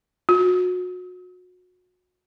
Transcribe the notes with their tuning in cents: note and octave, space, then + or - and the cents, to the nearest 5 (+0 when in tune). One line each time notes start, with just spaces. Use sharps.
F#4 -30